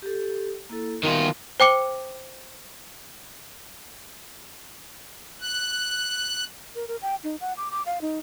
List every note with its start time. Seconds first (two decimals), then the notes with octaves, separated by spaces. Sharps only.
0.02 G4 A4
0.69 A#3 E4 A4
1.03 D#3 B3 F4 F#4 A#4
1.60 C5 G5 D6 C#7 G7
5.41 F#6
6.75 A#4
6.88 A#4
7.02 G5
7.24 D#4
7.41 F#5
7.57 D6
7.71 D6
7.86 F5
8.01 D#4